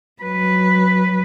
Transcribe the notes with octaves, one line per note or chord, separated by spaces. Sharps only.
F#3 B4